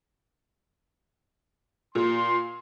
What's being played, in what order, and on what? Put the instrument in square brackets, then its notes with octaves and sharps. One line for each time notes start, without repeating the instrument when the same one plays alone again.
[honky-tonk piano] A#2 [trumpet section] C6